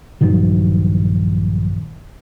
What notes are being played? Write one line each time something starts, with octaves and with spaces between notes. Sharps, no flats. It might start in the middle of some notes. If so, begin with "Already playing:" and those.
A#1 G2 D#3 F#3